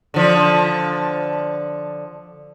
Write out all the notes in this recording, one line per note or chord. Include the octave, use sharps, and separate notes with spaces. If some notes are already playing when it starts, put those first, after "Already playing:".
D3 F3